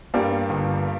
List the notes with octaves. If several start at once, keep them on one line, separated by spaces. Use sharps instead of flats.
G2 G3 A#3
G1